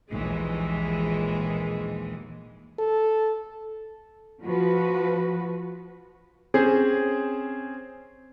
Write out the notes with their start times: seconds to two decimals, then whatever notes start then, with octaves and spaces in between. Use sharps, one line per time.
0.10 A#1 D#2 E3 G#3
2.79 A4
4.44 F3 F#4 B4
6.54 C4 C#4 G#4 C5